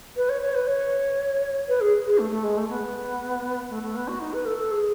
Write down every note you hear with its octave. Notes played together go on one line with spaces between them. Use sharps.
B4
C#5
C#5
B4
C#5
B4
G#4
G#4
A3
A3
G#3
A3
B3
A3
A3
B3
F#4
D#4
B4
A4
A4
G#4